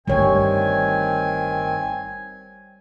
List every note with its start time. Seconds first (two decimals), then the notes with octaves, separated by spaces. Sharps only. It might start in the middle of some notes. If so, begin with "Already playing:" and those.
0.08 G1 D#3 G3 A3 C4 C#5 G#5